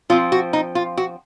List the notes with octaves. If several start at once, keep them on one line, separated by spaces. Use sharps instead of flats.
F3 C4 F4
F#4
D#4
F4
F#4